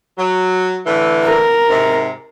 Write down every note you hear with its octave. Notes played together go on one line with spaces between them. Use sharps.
F#3
A2 D3 E3
A#4
G#2 C3